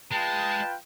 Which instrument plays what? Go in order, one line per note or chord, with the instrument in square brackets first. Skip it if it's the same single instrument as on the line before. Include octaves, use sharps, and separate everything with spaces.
[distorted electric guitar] G#3 [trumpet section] F4 B4 G5 [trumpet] A5